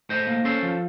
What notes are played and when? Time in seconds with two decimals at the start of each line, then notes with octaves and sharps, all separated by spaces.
0.09 A2 C5 D#5
0.27 A#3
0.44 C#4 A4 C5
0.63 F3